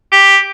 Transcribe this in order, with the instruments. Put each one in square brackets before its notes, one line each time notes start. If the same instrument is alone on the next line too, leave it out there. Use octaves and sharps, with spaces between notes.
[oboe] G4